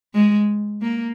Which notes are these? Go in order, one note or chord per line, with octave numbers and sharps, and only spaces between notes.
G#3
A#3